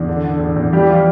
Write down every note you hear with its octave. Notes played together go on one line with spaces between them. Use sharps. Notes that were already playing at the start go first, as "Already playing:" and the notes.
Already playing: E2 D4
D3
D3
E2
E2
E3 G3 G4
E3 F3 F4